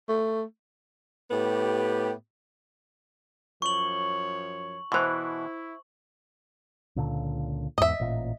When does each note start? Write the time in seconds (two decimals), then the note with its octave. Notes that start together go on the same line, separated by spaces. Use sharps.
0.09 A3
1.31 A2 B3 G4
3.62 F#2 F3 C#5 C#6 F#7
4.92 B2 E3 E4 C5 C6
6.96 C#2 A#2 D3
7.78 E2 G#2 D#5 E5
8.00 A1 A#2